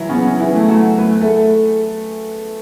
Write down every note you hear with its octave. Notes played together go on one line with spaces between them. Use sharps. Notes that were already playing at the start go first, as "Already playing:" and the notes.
Already playing: E3 F#3 E4
C#3 B3 C#4
E3 E4
A3
F#3 F#4
A3 B3 B4
A3 A4